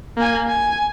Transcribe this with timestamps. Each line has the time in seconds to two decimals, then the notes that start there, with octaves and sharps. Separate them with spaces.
0.17 A#3 G#5
0.47 G#5